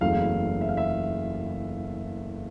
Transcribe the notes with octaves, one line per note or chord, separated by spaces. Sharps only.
F#1 E2 C#3 F#3 A3 F5
E5
F5
E5